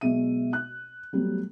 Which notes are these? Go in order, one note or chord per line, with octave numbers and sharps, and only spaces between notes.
B1 B2 G#3 E5 D#7
F#6
F#3 G3 A3 B3